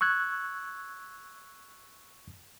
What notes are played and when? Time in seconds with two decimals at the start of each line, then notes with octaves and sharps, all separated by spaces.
0.01 C#6 E6 F#6 G#6